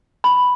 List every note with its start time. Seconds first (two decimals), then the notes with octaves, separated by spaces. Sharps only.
0.24 B5